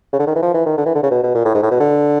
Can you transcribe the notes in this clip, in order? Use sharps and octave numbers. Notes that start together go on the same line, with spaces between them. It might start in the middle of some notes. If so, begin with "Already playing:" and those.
C#3
D3
D#3
E3
F3
E3
D#3
D3
E3
D3
C#3
B2
B2
A#2
A2
G#2
A2
B2
D3